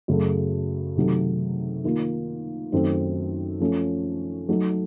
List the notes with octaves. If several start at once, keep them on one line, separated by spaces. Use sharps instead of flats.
F#2 C#3 F#3 A3
C3 D#3 F#3 A3
D#3 A#3 F4
F#2 D#3 A3 C4
F3 A3 C#4
F#3 A3 D#4 A4